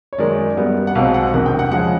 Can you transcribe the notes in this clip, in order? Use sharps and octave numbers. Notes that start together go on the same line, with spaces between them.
C#5
F#2 D#3 G#3 D5
F#2 D#3 G3 B3
F#5
B1 B2 G#3 C4 F5
F#5
E1 E2 C3 D#3 F#5
G5
F#5
C#3 F3 G#3 F#5